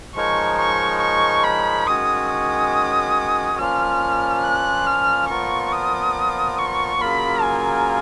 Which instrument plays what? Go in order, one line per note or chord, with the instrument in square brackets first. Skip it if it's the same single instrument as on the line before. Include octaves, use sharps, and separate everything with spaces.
[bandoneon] F3 G#3 D#4 A#4 C#5 [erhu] C#6
[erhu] C#6
C#6
B5
[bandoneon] D#3 G#3 C#4 F#4 C#5 [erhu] D#6
[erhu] D#6
[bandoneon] A#2 F3 A#3 C#4 F4 [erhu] F6
[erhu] F#6
F6
[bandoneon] A#2 F3 B3 F4 A#4 [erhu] C#6
[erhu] D#6
C#6
[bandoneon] C#3 F#3 A#3 F4 A#4 [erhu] B5
[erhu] G#5